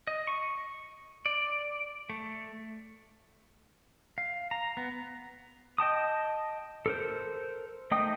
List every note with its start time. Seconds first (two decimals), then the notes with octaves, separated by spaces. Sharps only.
0.07 D#5
0.27 C#6
1.26 D5
2.10 A3
4.18 F5
4.51 A#5
4.77 B3
5.78 D#5 G5 A5 D#6
6.86 A4 A#4 C5
7.91 A3 D#4 D#5 G5 D#6